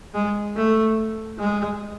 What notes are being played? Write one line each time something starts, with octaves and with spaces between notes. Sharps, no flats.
G#3
A3
G#3